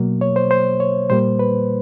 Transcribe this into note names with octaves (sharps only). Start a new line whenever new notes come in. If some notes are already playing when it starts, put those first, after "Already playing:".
Already playing: B2 F#3 A#3
C#5
C5
C5
C#5
A#2 G3 A#3 C5
B4